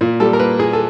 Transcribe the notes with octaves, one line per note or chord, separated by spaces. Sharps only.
A#2
G3 A4
A#4
A#3 B4
A#2 G#4
A4